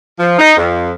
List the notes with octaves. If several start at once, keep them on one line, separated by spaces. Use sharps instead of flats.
F3
D#4
F2